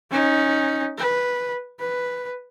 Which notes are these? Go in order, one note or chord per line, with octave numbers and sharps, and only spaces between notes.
C#4 D#4
B4
B4